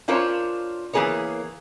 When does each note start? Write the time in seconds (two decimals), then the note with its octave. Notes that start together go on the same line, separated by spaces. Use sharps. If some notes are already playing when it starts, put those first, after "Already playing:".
0.08 C#4 D4 F4 A#4 C5 C#5
0.93 E3 A#3 B3 G#4 A#4 C#5